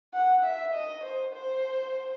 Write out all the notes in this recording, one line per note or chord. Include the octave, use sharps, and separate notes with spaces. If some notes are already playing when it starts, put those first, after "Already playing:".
F#5
E5
D#5
C5
C5